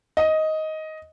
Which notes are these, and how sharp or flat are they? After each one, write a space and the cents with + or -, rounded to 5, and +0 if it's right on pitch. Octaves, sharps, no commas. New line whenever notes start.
D#5 +10